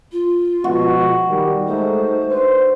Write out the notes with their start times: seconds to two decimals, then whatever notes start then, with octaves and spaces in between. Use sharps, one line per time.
0.12 F4
0.64 B2 F3 G#3 F#4
1.28 D#3 G3
1.67 G#3 A3 D#4 C5
2.30 D4 B4 C5